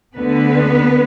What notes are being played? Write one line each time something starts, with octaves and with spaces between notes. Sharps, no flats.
D2 D3 B3 B4